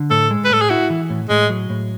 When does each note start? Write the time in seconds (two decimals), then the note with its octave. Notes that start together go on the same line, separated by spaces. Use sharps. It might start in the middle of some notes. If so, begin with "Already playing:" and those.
Already playing: D3
0.10 A2 A4
0.31 G#3
0.45 B4
0.50 A2 A4
0.61 G#4
0.70 E4 F#4
0.90 E3
1.10 A2
1.29 A2 G#3
1.50 F#3
1.70 A2